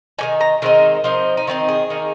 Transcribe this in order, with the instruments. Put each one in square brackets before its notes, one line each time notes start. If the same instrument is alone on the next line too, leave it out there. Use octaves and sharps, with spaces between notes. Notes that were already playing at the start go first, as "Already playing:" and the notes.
[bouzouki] D#3 A#3 D#4 G#5
A#5
D#3 G#3 C4 D#4 A#4
F3 C4 D#4
D#4
D#3 C4 D#4 F4
G#4
D#3 A#3 D#4